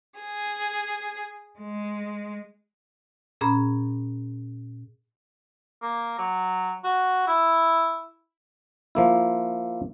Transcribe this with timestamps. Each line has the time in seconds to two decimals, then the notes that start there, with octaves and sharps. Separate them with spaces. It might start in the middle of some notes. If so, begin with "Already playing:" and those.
0.19 G#4
1.59 G#3
3.41 A#2 C#4 G#4 A#5 B5
5.82 A#3
6.18 F#3
6.84 F#4
7.27 E4
8.95 F3 A#3 E4